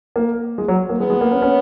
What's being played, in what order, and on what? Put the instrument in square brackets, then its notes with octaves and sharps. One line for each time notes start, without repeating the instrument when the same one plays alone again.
[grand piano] A#3
G#3
F#3
A#3
[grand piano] G#3 [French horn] B3
[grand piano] G#3
A#3
C#4
C#4